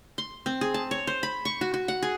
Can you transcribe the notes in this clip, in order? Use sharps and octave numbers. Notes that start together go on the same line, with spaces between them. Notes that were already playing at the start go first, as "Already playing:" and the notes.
C6
C4
G#4
A5
C#5
C5
B5
C#6
F#4
F#4
F#5
G#4